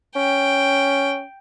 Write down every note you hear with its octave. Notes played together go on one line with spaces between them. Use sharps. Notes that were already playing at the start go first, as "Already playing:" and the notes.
C#4 G5